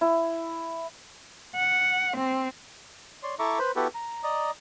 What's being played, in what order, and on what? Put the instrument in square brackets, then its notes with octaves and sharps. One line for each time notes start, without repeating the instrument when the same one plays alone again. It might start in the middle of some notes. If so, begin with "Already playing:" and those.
[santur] E4
[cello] F#5
C4
[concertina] C#5 D5 C6
E4 A4 E5 A#5 C#6 D6
B4 C5 B5
B3 E4 F#4 G4 A4 B4
A#5
D5 D#5 A#5